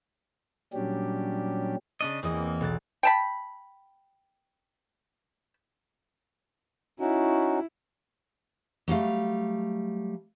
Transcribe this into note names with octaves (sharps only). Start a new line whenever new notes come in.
A#2 F#3 G3 C#4 D4 G4
C#3 D4 D#5
E2 E3 A#3 C4 D#5
B1 F#6 A6
G5 A5 B5
C#4 D#4 E4 F#4
F#3 G3 A3 F5